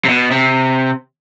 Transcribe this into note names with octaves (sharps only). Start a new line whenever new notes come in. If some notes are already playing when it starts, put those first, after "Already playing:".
C3
B2
C3